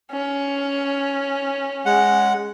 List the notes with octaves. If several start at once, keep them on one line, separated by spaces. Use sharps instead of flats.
C#4
G#3 F#5